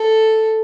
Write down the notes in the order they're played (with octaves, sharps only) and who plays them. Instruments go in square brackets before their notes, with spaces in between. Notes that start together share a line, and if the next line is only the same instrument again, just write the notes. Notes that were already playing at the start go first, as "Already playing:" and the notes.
Already playing: [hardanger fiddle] A4